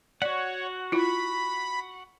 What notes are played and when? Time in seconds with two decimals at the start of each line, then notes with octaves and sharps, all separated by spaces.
0.22 F#4 C#5 D5 F#5
0.92 E4 F4 B5